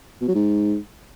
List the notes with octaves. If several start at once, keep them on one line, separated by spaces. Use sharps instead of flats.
B2
F#3
G#2